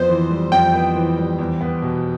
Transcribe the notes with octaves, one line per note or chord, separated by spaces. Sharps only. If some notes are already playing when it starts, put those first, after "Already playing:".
Already playing: F2 B3 C5
E3
G3
F2 G5
B3
E3
G3
E2
B3
B2